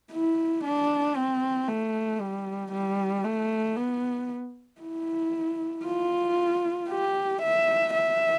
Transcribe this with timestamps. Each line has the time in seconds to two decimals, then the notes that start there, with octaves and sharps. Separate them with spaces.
0.12 E4
0.64 D4
1.16 C4
1.68 A3
2.21 G3
2.72 G3
3.25 A3
3.76 B3
4.81 E4
5.86 F4
6.89 G4
7.42 E5
7.94 E5